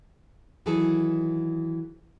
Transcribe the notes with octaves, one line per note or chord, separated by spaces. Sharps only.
D#3 E3 F#3 E4 G#4 A4